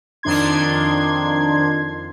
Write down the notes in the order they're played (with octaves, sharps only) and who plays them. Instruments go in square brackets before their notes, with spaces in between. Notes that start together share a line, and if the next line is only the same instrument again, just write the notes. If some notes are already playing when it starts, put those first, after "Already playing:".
[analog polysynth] F2 D#3 D4 C6 G#6